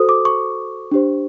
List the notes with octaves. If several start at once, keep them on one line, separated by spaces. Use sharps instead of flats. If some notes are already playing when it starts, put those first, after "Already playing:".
Already playing: F#4 A4 C5 D#6
D6
C#6
D4 G4 C5